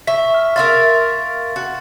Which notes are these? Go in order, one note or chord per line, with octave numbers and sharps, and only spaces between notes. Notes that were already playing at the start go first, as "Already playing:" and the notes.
E5 C#6 B6
F6
A#4 E5 F5 C6 A6
F#4